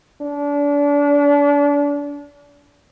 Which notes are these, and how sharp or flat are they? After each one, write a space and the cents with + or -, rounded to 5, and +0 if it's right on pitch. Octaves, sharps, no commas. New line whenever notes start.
D4 -35